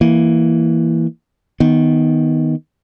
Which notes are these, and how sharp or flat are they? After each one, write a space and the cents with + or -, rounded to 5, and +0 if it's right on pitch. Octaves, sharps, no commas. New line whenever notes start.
E3 +0 A#3 +0
D#3 +15 B3 +0